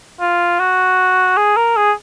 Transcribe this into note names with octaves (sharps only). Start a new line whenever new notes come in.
F4
F#4
G#4
A#4
G#4